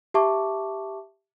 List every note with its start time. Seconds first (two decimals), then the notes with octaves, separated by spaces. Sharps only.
0.14 G4 E5 A5 C#6 D6